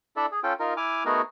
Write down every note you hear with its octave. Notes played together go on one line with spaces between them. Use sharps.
D4 E4 A4 D5 E5
G#4
C#4 F4 A4 G5
D#4 F4 A#4
E4 G#5 D6 F6
A3 B3 D#4 F#4 G#4 A#4